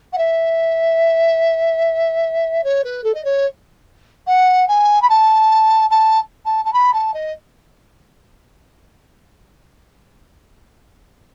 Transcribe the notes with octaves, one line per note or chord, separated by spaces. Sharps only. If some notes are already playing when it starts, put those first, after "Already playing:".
F#5
E5
C#5
B4
A4
D#5
C#5
F#5
G#5
B5
A5
A5
A5
A5
B5
A5
D#5